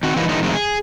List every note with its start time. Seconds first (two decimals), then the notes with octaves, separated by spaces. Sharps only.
0.03 D#3 C4 F#4
0.16 E3 F#3 G3 A#3 D#4 E4
0.29 D3 E3 G3 B3 D#4
0.42 F2 D#3 G#3 A3
0.54 G#4